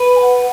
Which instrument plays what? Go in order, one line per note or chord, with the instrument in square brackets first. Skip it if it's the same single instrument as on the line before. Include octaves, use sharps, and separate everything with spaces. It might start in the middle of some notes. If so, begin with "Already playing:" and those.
Already playing: [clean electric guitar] B4
[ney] G#5
F#5